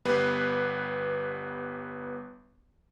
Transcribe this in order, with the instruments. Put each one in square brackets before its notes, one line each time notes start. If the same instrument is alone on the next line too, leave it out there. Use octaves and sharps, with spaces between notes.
[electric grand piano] G1 G3 B3 B4 C7